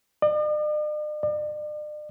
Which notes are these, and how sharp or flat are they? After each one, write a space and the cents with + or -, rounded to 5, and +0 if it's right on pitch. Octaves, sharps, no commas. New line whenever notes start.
D5 +45
D5 +40